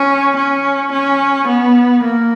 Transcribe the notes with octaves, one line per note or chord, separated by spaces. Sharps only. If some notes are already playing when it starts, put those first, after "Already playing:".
Already playing: C#4
C#4
C#4
B3
A#3